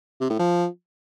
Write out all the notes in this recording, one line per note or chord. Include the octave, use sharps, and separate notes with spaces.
C3
A2
F3